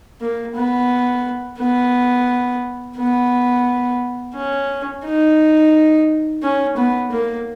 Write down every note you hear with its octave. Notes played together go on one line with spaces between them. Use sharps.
A#3
B3
B3
B3
C#4
D#4
C#4
B3
A#3